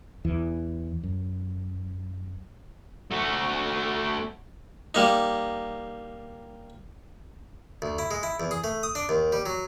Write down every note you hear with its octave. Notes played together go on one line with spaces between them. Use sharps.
E2 E3
F#2
A3 F#4
G3 A#3 D#4
D2
E4
G#3
E4
E2
G#4
A3
D#6
D4
D#2
G3
F#3